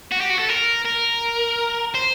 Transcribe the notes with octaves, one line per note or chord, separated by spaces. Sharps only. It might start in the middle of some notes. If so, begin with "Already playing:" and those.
F#4
G4
F#4
A4
A#4
A#4
C5